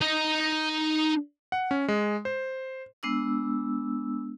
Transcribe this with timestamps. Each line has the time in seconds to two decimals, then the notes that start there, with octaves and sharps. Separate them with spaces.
0.01 D#4 D#5
1.52 F#5
1.71 C#4
1.88 G#3
2.25 C5
3.03 G#3 B3 D4 E6